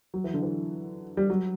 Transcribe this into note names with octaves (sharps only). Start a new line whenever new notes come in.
F#3
E3
D3
E3
G3
F#3